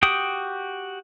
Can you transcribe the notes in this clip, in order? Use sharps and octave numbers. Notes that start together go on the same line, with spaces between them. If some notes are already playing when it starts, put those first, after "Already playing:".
F#4 G4 G5 D#6